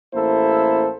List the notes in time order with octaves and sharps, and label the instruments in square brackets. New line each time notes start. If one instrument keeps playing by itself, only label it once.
[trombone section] A1 A#3 E4 A4 C5